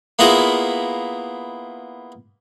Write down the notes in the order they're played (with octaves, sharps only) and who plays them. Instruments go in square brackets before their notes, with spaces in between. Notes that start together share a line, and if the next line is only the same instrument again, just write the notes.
[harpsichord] A#3 B3 E4 F4 G#4 A#4